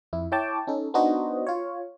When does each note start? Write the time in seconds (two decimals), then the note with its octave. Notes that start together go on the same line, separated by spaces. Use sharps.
0.13 F2 E4
0.32 E4 C#5 G5 A5 D6
0.67 C#4 D#4 A4
0.94 B3 D4 D#4 F#4 C5 D#5
1.47 F4 C#5